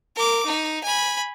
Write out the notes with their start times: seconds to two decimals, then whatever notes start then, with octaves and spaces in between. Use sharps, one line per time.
0.16 A#4 D6
0.46 D#4
0.83 G#5 B5